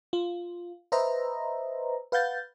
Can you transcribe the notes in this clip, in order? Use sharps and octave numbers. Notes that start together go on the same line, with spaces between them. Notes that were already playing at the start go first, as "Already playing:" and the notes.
F4
B4 C5 D#5 E5 A#5
B4 F5 F#5 G6 A6